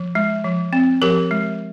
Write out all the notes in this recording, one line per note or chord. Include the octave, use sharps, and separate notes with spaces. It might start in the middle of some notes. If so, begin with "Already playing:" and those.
Already playing: F3
G#3
F3
C4
F3 G4 A#4
G#3